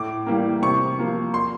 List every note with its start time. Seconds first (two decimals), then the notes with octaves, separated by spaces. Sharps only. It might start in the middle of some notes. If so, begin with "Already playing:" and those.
Already playing: A2 D6
0.26 E3 G3 A#3
0.62 C3 C#6
0.98 F3 A#3
1.34 C6